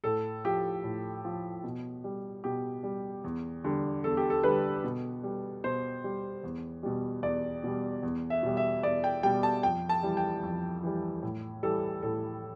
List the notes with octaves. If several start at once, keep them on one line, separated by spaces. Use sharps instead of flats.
A2 A4
F3 G4
A2
F3
B2
G3
B2 G4
G3
E2
D3 G3
E2 A4
G4
A4
D3 G3 B4
B2
G3
B2 C5
G3
E2
B2 G3
E2 D5
B2 G3
E2
E5
B2 G3
E5
E2 D5
G5
B2 G3 G5
A5
F2 G5
A5
E3 G3
G5
F2
E3 G3
A2
E3 G3 A4
A2 A4